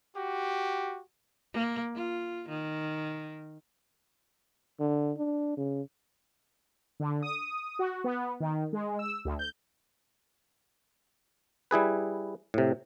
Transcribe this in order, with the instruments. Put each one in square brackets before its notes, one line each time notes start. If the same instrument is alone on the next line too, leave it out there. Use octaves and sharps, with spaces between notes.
[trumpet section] F#4 G4
[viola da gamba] A#3
F4
D#3
[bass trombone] D3
D4
C#3
[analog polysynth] D3
D#6
F#4
B3
D#3
G#3
E6
D2
G6
[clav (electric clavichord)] G3 E4 G#4 B4
A2 C3